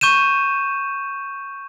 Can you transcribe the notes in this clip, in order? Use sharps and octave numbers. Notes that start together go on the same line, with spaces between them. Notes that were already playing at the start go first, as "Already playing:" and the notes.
C#6 G6 D#7 E7